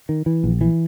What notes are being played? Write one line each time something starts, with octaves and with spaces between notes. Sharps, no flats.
D#3
E3
A#1
E3